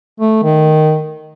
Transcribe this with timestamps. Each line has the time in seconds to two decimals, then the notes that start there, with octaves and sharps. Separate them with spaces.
0.20 A3
0.43 D#3